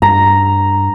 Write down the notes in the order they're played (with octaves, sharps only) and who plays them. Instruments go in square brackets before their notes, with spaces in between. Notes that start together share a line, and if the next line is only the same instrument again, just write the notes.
[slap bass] G2 [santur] A#5